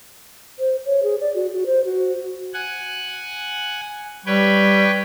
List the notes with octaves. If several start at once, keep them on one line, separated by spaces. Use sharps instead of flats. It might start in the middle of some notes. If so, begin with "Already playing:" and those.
C5
C#5
G#4
D5
F#4
F#4
C5
F#4
F#5 G#5
G3 B4 C#5 G5